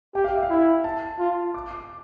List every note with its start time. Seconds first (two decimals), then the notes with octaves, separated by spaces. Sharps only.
0.15 G4 G5
0.24 F5
0.33 E5
0.43 F5
0.50 E4
0.84 A5
1.19 F4
1.54 D6
1.71 D6